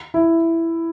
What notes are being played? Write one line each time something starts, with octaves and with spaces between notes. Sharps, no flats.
E4